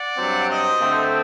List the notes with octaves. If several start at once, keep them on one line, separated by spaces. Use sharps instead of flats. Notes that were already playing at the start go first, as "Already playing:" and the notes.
Already playing: D5 F#5
G2 F#3 C4
C5 D#5
D3 A3 C4